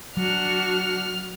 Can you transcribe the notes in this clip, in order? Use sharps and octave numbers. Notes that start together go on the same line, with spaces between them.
F#3 D4 F#4 F6